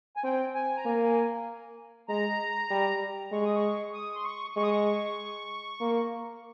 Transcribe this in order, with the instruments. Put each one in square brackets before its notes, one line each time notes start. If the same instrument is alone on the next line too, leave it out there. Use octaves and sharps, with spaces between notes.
[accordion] G#5
[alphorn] C4 [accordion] G5
[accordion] G#5
A#5
[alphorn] A#3 [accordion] G#5
[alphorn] G#3 [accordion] A#5
[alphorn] G3
[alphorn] G#3 [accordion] C#6
[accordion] D#6
C#6
D#6
C6
C#6
[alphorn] G#3 [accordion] C#6
[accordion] D#6
C#6
[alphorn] A#3